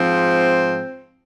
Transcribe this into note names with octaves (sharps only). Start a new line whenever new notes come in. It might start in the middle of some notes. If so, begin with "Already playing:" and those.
Already playing: G#2 F3 C4